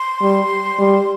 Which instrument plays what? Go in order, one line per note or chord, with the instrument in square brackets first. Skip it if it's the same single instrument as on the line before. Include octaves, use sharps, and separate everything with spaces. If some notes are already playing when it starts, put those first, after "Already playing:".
Already playing: [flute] C6
[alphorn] G3
G3